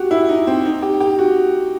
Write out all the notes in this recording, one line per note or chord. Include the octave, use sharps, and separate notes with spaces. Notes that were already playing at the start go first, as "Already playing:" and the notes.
Already playing: F#4 G4
E4
D#4
C4
D#4
G4
G4
F#4